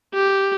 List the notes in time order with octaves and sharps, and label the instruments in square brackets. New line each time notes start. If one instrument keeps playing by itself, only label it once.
[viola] G4